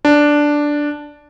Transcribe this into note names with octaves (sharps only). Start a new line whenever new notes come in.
D4